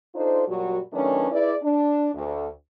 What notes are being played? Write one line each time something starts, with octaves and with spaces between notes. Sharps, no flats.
D4 D#4 F4 A4 C5
F#2 A#2 F#3 G3 F#4
D#3 F#3 A3 C#4 D4 B4
E4 G#4 B4 D5
D4
D2